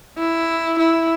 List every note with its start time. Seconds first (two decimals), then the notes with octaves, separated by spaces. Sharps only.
0.18 E4
0.79 E4